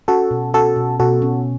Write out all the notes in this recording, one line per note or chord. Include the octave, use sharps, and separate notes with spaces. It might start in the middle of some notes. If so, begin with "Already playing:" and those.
C#4 F#4 A4
B2
C#4 F#4 A4
B2
B2 F#4 A4
C#4